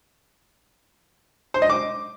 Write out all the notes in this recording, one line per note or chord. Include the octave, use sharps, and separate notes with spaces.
C5
D#5
D6